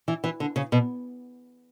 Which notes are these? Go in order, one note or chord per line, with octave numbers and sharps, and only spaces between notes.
E3
E3
D3
C#3
B2